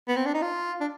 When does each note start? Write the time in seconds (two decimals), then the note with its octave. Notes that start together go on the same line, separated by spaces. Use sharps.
0.08 B3
0.16 C4
0.26 D4
0.34 D#4
0.42 F4
0.80 D4